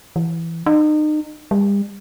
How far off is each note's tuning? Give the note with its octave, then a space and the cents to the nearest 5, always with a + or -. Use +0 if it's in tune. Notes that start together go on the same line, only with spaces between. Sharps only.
E3 +10
D#4 -35
G3 +40